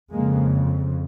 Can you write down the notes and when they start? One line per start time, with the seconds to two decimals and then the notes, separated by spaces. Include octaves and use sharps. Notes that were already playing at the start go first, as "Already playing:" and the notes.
0.11 F2 C#3 G#3 A#3